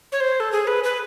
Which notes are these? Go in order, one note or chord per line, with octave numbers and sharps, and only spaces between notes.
C#5
C5
A4
G#4
B4
B4